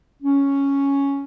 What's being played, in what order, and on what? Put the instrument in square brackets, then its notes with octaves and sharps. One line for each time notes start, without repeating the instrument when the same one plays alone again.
[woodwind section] C#4